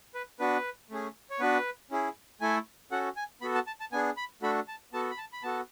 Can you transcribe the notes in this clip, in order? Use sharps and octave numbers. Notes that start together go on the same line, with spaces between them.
B4
B3 D4 F#4 B4
A3 C#4 G#4
C#5
B3 D4 F#4 B4
C#4 E4 G#4
A3 E4 A4 G#5
C#4 F#4 A4 F#5
G#5
B3 F#4 A4 B5
A5
A5
A5
B3 D4 G#4 G#5
B5
A3 D4 F#4 A4 B5
A5
B3 F#4 A4 A5
B5
A5
B5
B3 F#4 A4 A5